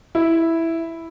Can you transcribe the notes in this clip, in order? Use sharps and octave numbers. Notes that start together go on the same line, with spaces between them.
E4